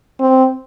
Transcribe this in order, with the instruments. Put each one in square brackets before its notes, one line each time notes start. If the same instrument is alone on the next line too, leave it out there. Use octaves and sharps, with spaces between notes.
[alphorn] C4